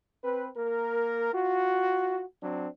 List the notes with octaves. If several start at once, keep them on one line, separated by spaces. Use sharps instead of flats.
C4 B4
A#3 A#4
F4 F#4
F#3 C4 D4